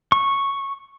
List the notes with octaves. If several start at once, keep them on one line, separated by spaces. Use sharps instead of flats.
C#6